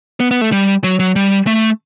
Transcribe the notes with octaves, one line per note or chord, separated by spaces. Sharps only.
B3
B3
A3
G3
F#3
F#3
G3
A3